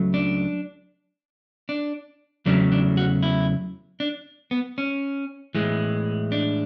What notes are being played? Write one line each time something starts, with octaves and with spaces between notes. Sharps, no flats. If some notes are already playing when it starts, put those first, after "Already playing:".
Already playing: C#2 C#3 F#3 A3
D4
D4
E2 C#3 F#3 A3 D4
D4
F#4
E4
D4
B3
C#4
A2 E3 G#3
D4